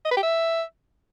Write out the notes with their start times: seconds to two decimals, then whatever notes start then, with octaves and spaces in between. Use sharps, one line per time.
0.05 D#5
0.11 B4
0.17 G4
0.23 E5